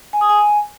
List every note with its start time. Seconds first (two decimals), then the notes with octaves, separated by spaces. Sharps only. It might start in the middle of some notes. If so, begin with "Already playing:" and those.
0.13 G#5
0.21 D#6
0.29 G#5